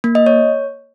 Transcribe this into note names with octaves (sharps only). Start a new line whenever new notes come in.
A#3
D#5
C#5